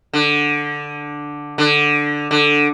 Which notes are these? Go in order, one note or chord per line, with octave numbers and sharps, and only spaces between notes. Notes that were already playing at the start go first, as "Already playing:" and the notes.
D3
D3
D3